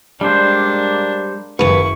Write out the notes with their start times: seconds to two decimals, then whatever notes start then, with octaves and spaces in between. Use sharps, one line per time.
0.21 G3 G#3 A#3 D4 C5
1.59 F#1 D#2 E4 B4 C#6